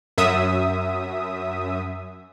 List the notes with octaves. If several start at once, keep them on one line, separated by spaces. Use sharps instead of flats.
F#2 E5 D#6